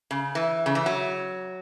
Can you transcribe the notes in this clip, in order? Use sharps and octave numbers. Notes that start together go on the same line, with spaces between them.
C#3
E3
C#3
E3
F#3